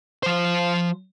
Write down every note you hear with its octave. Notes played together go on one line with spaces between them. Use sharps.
F3 C5